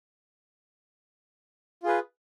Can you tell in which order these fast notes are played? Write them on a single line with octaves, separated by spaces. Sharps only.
F4 G#4 B4